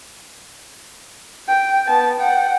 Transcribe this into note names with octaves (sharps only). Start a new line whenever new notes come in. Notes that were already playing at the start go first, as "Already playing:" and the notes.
G5
B3 A5
F#5 G5